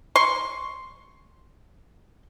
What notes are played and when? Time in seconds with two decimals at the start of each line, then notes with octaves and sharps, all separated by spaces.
0.16 C6 C#6